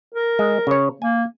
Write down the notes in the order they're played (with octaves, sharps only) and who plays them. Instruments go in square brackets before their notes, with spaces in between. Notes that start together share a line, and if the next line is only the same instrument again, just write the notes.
[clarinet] A#4
[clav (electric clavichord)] G#3
C#3 C#5
[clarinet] A#3 [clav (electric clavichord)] G#5